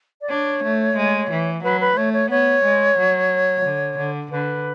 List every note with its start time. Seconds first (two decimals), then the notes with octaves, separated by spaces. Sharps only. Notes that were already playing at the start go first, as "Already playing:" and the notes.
0.21 D5
0.29 D4 C#5
0.63 A3
0.97 G#3
1.30 E3
1.63 F#3 B4
1.81 B4
1.96 A3 C#5
2.13 C#5
2.30 B3 C#5
2.64 G#3
2.97 F#3
3.65 D3
3.97 D3
4.31 D3 B4